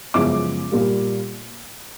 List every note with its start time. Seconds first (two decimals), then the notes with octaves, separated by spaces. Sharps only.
0.14 F#2 C#3 F3 G#3 B3 D6
0.72 A#2 G3 A#3